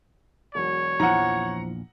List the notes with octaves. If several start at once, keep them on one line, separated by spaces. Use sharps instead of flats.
E1 F#3 C#5
A#1 E2 E3 F3 F#5 A#5